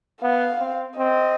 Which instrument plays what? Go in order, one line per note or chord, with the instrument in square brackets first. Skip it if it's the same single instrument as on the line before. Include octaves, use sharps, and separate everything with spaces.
[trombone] B3 [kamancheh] F5
[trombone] C4
[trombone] C4 [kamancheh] D#5